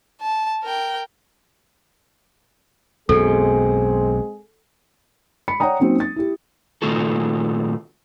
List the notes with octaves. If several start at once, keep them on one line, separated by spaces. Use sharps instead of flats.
A5
A#4 G5
B1 F#2 B2 G#3 C4 G#4 A4
B5 C#7
C#5 D5 F#5 G5 A#5 D#6
F#3 A#3 C4 C#4 D#4
A6
E4 G4
A#2 D#3 A3 F4 F#4 A4